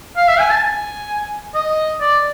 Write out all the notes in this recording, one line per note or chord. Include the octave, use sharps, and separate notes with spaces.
F5
E5
G#5
A5
G#5
D#5
D5